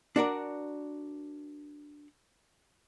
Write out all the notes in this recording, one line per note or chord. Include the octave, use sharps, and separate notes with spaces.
D4 F#4 A#4 D5